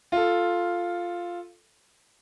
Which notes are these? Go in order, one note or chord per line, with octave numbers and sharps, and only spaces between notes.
F4 A4